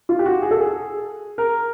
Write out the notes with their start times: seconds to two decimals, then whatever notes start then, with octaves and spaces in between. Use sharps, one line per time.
0.09 F4
0.19 G4
0.26 F#4
0.42 G#4
0.51 A4
0.61 G#4
1.38 A#4